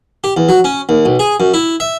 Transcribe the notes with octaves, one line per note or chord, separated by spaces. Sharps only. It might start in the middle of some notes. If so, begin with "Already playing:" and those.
G4
E2
F#3
C#4
D#2
B1
G#4
F#2
E4
E5